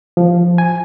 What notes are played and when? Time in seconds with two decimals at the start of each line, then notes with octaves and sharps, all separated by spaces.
0.17 F3
0.58 G#5